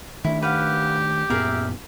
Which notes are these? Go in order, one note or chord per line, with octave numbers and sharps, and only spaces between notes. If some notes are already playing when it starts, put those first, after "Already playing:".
D#3 A3 D4 E4
G4 B4 F5 F#5
F#2 A#2 B3 G#4 A#4 E5